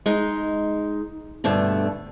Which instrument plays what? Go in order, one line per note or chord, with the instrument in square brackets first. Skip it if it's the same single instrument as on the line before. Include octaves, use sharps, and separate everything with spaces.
[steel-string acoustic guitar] G#3 D#4
G2 B2 D3 A3 A5